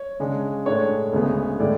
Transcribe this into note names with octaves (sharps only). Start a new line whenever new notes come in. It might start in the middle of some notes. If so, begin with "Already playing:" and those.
Already playing: C#5
C#3 G#3 D4
A2 G#3 D4 C#5
D2 C#3 G#3 B3
A2 E3 G#3 D5